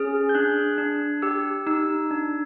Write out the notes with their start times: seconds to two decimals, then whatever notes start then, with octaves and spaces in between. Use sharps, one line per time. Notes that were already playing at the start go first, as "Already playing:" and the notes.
Already playing: C#4 G#4 F6
0.29 G6
0.35 D4 F#6
0.78 D4
1.22 G4 E6
1.66 D#4 E6
2.11 D4